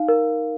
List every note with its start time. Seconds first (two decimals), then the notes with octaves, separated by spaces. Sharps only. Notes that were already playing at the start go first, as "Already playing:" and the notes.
Already playing: D#4 F5
0.08 A#4